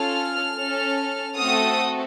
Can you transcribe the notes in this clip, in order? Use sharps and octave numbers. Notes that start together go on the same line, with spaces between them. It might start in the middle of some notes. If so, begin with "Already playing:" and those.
Already playing: C#4 F4 A4 F6
C#4 A4
A3 C4 F#4 A4 D#6